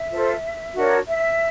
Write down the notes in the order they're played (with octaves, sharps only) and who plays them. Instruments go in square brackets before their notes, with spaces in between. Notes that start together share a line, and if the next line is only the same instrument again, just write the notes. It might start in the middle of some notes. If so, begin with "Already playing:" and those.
Already playing: [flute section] E5
F4 A4 C5
D4 F#4 A#4 C#5
E5